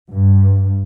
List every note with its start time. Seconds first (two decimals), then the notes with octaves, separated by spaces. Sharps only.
0.11 G2